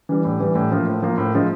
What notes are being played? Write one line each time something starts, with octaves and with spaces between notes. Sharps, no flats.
E3 G3
A2
E3 G3
A2
F3 A#3
A2
F3 A#3
A2
F3 G#3